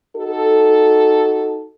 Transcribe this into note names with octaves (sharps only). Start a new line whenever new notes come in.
D#4 F#4 A4